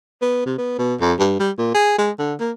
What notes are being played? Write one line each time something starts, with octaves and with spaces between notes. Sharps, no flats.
B3
C3
B3
B2
F2
G2
G3
A#2
G#4
G#3
D3
A#3